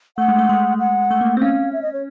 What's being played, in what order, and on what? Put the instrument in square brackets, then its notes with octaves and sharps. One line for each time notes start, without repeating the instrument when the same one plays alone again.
[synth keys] A3 [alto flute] F#5
[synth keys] G#3
A3
G#3
[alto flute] F#5
[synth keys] A3
A#3
C4
[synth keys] C#4 [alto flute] F5
[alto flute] E5
D#5
C#5